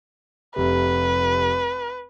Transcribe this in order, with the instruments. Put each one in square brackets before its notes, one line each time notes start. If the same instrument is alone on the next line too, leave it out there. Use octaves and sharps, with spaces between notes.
[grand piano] F1 C3 [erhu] B4